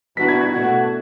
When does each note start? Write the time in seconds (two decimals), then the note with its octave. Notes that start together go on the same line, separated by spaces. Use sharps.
0.17 E3 B3 D4 F#4 B6
0.28 G#6
0.41 G#6
0.52 B2 A3 D4 F#4